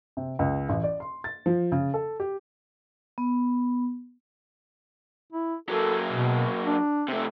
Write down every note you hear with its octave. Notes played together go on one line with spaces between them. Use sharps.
C3
C#2
A1
D5
C6
A6
F3
C#3
A4
G4
B3
E4
F#3 A#3 A4
B2
D4
C3 A3